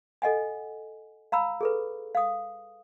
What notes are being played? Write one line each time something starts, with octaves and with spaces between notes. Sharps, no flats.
A4 D#5 F#5 G#5
F5 A#5 B5 E6
G#4 A4 B4
F5 D#6